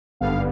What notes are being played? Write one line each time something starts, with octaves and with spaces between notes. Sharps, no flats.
G#1 G2 D3 G3 B3 F5